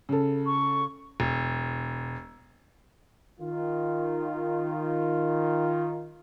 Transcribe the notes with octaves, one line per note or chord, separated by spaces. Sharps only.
C#3 A4
C#6
E1
D#3 F4